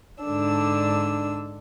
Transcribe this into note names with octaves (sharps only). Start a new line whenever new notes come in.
G#2 D3 D4 E6